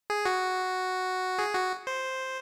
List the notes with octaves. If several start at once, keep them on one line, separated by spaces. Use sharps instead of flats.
G#4
F#4
G#4
F#4
C5